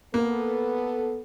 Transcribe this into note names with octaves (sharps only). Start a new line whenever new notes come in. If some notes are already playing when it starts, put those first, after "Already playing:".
A#3 B3 A4